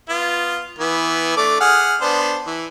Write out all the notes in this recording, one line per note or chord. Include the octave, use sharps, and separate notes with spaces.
B3 F4
E3 B3
A3 D4 D6
G#4 F#5 F6
B3 D4 C5
E3